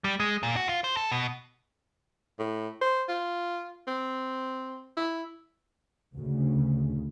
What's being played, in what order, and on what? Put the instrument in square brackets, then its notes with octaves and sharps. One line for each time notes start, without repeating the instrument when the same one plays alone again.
[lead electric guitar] G3
G#3
A#2
F#4
F4
C5
A4
B2
[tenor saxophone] A2
C5
F4
C4
E4
[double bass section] D2 C#3